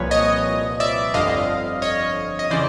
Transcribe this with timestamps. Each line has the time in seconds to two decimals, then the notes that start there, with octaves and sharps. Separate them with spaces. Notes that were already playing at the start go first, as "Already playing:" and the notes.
Already playing: C2 A#2 F3 B4 C#5
0.11 C#5 D#5
0.80 D5 E5
1.14 G1 F2 D3 D#5 F5
1.82 C#5 D#5
2.39 D#5
2.51 C#3 E3 C5 D5